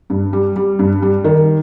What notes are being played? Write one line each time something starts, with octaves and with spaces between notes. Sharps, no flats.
G2
G3
G3
G2
G3
D#3